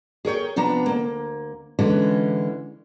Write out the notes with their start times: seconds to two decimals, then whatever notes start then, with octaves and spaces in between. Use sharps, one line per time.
0.25 G#4 A#4 C#5 G5
0.56 C3 F3 B3 D4 A#5
0.86 D2 A#3
1.79 D3 E3 G#3 C#4